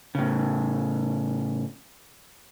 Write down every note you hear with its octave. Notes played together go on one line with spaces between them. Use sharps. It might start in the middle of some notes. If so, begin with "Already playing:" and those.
A2 C#3